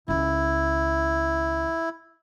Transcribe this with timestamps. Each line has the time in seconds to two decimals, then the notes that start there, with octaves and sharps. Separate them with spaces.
0.08 C#2 D#3 E4